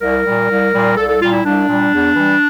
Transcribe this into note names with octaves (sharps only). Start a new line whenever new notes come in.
C2 A#4
A#2 G3
C2
A#2 G3
C2 A4
A4
A#2 G3 F4
E4
C2 D4
A#2 G3
E2
E3 G3